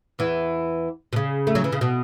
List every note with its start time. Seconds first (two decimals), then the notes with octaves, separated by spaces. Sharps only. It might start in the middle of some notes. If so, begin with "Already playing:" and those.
0.19 E2 E3
1.13 B2
1.16 C#3
1.47 A3
1.55 F#3
1.64 E3
1.72 C#3
1.81 B2